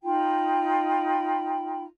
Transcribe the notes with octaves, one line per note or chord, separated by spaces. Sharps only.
D#4 F4 G5 B5